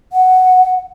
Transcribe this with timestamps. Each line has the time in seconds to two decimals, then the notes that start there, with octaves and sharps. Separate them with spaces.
0.12 F#5